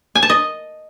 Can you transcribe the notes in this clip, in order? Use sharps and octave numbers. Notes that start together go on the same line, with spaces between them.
G#5
A5
D#5